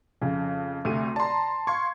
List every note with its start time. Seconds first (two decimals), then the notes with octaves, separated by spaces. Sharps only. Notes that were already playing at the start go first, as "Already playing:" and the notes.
0.21 F2 C#3
0.85 D2 C3 A3 D#7
1.16 D5 A5 A#5 C6
1.67 F5 C6 C#6 G#6